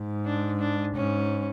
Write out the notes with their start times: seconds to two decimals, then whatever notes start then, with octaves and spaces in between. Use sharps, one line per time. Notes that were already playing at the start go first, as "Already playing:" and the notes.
Already playing: G#2
0.26 D4
0.60 D4
0.95 G#2 C#4